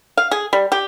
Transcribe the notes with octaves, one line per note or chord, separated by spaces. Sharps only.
F5
G#4
G3
G4